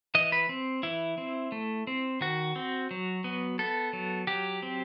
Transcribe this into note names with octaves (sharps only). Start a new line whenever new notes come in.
E3 D#5
B4
C4
E3 E4
C4
A3
C4
D#3 F#4
C4
F#3
B3
B3 A4
F#3
F#3 G4
C4